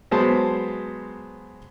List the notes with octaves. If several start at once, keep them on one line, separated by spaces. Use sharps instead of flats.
F#3 G#3 B3 C5 A5